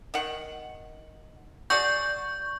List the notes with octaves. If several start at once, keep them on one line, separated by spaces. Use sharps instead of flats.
D#3 F#5
F#4 G#4 D5 C#6 G6